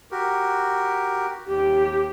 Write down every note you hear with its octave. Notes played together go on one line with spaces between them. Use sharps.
F#4 G4 A#4
D#2 G4